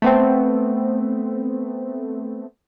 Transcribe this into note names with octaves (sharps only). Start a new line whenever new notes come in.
A3 B3 C4